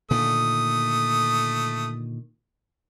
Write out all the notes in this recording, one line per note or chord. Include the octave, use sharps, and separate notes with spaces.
A#2 D3 D#3 A3 D#6